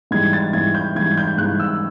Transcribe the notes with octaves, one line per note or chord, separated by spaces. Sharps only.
G#2 E3 G3 G#6
A6
G#2 E3 G3 G#6
G6
G#2 E3 G3 G#6
G6
G#2 E3 G3 F#6
E6